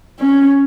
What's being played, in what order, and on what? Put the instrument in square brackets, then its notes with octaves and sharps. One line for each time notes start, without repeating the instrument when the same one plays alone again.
[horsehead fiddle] C#4